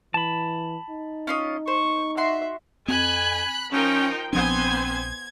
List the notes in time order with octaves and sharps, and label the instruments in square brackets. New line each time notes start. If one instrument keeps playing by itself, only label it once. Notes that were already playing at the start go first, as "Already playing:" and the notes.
[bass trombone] E3 [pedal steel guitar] A5 B5
[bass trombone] D#4
[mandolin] C#4 F4 D#5
[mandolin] C5 [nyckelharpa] C#6
[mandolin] F#4 C6 [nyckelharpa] E5
[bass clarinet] F2 [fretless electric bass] C4 [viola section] G#5 [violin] B5 F#6
[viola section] F3 G5 [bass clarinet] C#4 [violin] D#4 A#4
[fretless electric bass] A#1 F3 D4 [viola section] B3 C5 G#5 [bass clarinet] C4 [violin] G#6